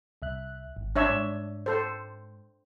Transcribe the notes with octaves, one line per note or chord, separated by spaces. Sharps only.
C2 E5 F#6
G#1
D4 C#5 E5
G#2
A4 C5